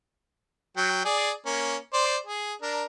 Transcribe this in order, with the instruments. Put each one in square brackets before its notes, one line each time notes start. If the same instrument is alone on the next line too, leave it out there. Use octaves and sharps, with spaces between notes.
[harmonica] F#3 G5
G#4 D5
A#3 C#4
C5 D5
G#4
D4 A#4